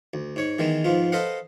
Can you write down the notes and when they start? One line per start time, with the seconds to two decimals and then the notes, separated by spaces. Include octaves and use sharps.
0.14 D2
0.36 G#2 C#5 C#6
0.59 D#3 E3 G#3 B3
0.84 G#2 F3 B3 F4
1.12 A4 B4 C5 D#5 F5 F#5